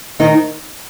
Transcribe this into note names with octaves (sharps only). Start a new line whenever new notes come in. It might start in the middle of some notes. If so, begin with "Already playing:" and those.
D#3 D#4